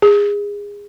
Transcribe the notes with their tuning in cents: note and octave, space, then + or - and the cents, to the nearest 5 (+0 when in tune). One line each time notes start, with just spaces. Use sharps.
G#4 -25